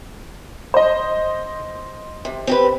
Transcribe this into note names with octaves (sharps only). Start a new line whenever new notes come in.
C5 D#5
C3
C4 G4 B4